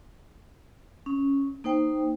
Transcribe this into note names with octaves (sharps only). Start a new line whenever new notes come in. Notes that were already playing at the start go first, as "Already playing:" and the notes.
C#4
A#3 D#4 C5 G5